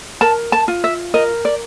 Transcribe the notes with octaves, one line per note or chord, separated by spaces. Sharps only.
A#4 A5
A5
F4
E5
A#4 D#5
D5